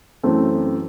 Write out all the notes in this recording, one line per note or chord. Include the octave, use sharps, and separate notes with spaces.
F#2 E3 A3 C4